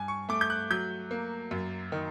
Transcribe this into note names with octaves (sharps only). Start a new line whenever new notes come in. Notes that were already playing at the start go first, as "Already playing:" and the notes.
Already playing: G2 G#5
C#6
A3 D6
G6
F#6
F#3 G6
A#3
F#2
D#3